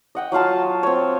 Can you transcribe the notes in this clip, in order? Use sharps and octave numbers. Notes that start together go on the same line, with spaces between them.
D#5 F#5 G5
F#3 F4 F5 A5
C4 C#5